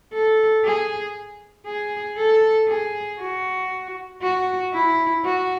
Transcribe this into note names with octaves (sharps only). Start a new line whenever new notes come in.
A4
G#4
G#4
A4
G#4
F#4
F#4
E4
F#4